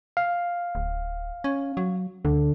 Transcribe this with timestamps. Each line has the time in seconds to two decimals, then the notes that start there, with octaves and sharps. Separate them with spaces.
0.17 F5
0.75 D1
1.44 C#4
1.77 F#3
2.25 D2 D3